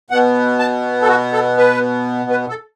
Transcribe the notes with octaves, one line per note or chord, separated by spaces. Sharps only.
B2 B3 F#5
A5
A4
F#4
A4
B4
B4
A4